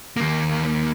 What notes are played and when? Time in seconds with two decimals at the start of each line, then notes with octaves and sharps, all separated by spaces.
0.17 D#2 A#3